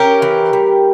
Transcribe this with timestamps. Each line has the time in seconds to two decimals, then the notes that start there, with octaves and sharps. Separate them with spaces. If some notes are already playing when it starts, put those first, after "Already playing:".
Already playing: C#4 G4 A#4
0.22 E3
0.53 G3